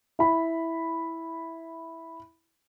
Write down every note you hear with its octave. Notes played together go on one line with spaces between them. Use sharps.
E4 B5